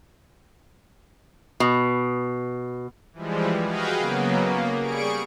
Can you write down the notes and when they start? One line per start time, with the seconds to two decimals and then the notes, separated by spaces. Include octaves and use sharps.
1.60 B2
3.13 E3 F3 G3 G#3
3.63 F#4 G#4 B4 D#5 F5 G5
3.97 C#3 F#3 A#3 B3
4.41 A#3
4.81 G3 G#4 C#6 D7